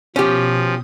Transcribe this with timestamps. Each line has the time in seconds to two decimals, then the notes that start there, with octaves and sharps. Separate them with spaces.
0.16 B2 F3 C#4 G4 D#6